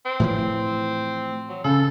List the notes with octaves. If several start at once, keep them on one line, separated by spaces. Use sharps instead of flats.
C4
A2 E3 F3
F#3
C#3 A4